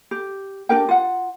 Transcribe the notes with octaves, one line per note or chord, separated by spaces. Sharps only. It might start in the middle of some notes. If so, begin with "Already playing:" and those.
G4
D4 G4 A#4 G5
F4 F#5